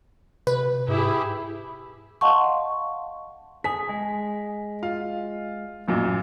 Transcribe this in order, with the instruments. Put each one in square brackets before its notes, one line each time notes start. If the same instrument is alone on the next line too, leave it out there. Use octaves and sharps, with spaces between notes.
[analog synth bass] C3 [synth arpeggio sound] B4
[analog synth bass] G#2 [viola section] E4 G4 G#4
[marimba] D#5 F5 F#5 A5 C6 C#6
[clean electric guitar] G#4 [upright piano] B6
[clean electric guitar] G#3
[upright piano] F4 F5
A1 F#2 A#2